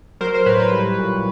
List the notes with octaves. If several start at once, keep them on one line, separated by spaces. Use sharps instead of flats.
F#3 A#4 C5
A#4 C5
A2 B4 C#5
B4 C#5
G3
A#2